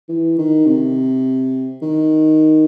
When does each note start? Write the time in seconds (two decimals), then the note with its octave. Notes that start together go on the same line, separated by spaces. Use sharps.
0.09 E3
0.38 D#3
0.67 C3
1.82 D#3